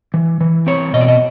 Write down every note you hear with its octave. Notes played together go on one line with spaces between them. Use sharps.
E3
E3
C4 C#5
B2 D#5
D5
D#5